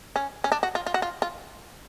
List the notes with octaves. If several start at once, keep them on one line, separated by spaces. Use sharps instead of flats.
C#4
C#4
D4
F#4
F4
F4
F#4
F4
F4